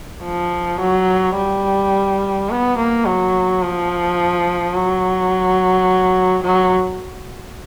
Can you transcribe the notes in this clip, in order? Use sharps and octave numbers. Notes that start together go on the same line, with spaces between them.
F3
F#3
G3
B3
A#3
F#3
F3
F#3
F#3